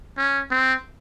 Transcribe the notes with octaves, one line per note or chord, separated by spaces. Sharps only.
C#4
C4